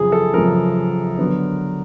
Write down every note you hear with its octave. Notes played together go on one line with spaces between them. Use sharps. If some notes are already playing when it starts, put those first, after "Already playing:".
Already playing: F#2 C#3 F3 G#4
A4
F#2 C#3 F3 A#4
D3 F#3 B3